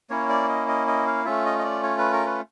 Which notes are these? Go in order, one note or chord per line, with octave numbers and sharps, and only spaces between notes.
A#3 C#4 E4 C#5
D5
D#5
D#5
D#5
F5
A3 C#4 F4 E5
D#5
D#5
D5
C#5
B4
A#4
B4